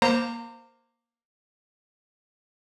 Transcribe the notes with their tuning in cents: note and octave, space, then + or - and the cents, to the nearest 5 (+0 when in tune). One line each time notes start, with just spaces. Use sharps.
A#3 +10 C5 +0 A#5 -35